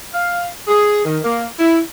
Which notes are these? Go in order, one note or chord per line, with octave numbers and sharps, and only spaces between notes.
F5
G#4
D#3
A#3
E4